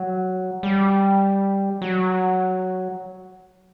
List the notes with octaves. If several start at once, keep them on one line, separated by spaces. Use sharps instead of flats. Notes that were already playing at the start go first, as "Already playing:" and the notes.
Already playing: F#3
G3
F#3